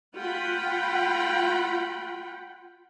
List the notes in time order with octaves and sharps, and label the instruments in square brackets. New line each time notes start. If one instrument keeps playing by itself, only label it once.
[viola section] F4 F#5 G5 B5